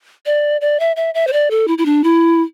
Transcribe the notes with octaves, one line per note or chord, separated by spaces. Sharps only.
D5
D5
E5
E5
E5
C5
D5
A4
E4
E4
D4
E4